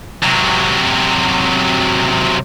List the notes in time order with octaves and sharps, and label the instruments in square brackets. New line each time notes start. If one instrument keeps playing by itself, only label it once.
[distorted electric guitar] C3 F#3